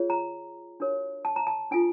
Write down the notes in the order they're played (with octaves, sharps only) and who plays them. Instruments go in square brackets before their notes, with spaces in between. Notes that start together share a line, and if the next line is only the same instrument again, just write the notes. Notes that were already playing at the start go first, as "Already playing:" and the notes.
Already playing: [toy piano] F4 G#4 C#5
A#5
D4 F#4 A#4 C#5
A5
A#5
A5
D4 F4 A4 G#5